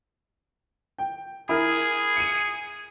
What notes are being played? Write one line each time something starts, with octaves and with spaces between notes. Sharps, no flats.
G5
E4 G#4 A#4
C#7 D#7